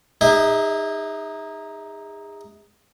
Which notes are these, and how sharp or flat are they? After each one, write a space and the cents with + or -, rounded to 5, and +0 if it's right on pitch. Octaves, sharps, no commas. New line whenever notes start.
D#4 +0 G#4 -35 E5 -30